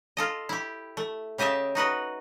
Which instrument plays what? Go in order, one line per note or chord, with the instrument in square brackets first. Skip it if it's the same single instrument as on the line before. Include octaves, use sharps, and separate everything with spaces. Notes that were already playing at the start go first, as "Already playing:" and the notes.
[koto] F4 A4 D#5
E4 G4
A3
C#3 G4 D#5 E5 A5
D#4 F#4 B4 D#5